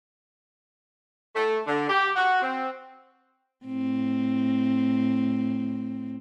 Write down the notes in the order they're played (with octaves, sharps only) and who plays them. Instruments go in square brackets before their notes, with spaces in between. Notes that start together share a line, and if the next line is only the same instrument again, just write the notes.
[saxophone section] A3
D3
G4
F#4
C4
[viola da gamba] A2 C4